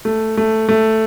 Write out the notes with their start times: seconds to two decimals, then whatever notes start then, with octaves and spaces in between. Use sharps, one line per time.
0.05 A3
0.38 A3
0.69 A3